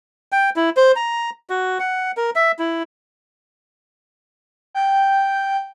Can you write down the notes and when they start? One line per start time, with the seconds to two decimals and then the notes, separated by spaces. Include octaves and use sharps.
0.32 G5
0.56 E4
0.77 C5
0.96 A#5
1.50 F#4
1.80 F#5
2.17 A#4
2.36 E5
2.59 E4
4.75 G5